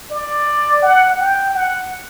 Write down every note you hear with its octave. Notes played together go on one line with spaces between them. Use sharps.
D5
F#5
G5
F#5